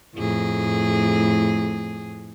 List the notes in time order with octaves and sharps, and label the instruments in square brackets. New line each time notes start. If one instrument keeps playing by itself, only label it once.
[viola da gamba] F2 A2 G#4